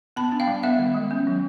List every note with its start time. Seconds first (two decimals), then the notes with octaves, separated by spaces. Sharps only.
0.16 B3 A5 B5
0.32 D4
0.40 F5 G5
0.48 G3
0.63 B3 E5 F#5
0.79 D#3
0.95 G#3
1.11 C#4
1.27 F#3